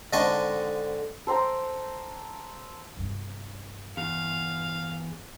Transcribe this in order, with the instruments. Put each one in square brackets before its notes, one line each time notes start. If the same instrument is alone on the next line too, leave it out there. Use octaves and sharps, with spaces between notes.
[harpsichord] G#2 D3 C4 A4 D#5 C#6
[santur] A4 C5 G5 A#5
[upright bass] G2 C3
[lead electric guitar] E2 [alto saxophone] F5